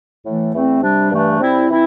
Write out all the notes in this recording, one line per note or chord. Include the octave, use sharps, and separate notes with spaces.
A2 E3 A3
E2 E3 A3 C4
C3 G3 D4
G2 E3 A3 D4
C3 G3 C4 E4
E3 C4 E4